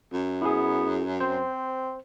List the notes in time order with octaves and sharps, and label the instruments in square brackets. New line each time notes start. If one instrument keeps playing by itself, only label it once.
[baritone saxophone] F#2
[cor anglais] B3 [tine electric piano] E4 G#4
[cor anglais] C4 [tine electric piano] C5